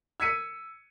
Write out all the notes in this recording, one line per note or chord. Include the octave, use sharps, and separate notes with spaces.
E6 G#6 B6 C#7 D#7